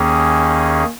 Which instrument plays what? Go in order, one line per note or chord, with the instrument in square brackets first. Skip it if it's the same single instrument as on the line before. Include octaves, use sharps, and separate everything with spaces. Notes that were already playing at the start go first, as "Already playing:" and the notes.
Already playing: [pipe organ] D#2 D#3 A#3 C#4 G#4